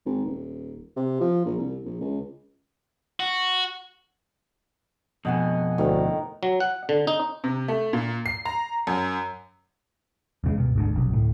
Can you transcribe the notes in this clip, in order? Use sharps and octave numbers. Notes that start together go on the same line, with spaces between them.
G#1
D#1
C3
F3
A#1
C2
A#1
C#2
F#4
F2 B2 D#5 F#5 G#5
D2 A2 D#3
F#3
F#5
D3
D#4
C3
A3
A#2
C7
A#5
F#2
E2 C#3 G#3
C#2 G2 B2
G#1 D2 G#2
F1 B1 F#2
D1 A2